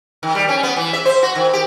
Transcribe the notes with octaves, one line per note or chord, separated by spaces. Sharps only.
D#3
G3
C#4
B3
E3
E5
C5
F#4
D#3
G4